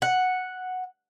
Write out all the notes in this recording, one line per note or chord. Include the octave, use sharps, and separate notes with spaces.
F#5